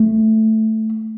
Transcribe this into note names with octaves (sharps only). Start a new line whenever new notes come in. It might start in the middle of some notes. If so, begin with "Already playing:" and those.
Already playing: A3